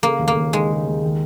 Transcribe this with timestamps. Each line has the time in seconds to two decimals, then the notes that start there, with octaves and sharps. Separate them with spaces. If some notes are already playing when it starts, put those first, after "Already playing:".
0.03 C#3 A#3
0.19 D#2
0.28 A#3
0.36 D#2
0.53 G#3 D#4
0.70 C#3
0.86 D#2
1.03 D#3